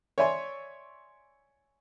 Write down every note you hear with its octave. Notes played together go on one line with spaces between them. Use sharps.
C#5 D5 E5 G#5 C6